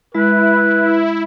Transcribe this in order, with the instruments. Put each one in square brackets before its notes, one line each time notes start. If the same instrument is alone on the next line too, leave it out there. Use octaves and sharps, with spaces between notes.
[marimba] G#3 [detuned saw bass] E4 [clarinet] B4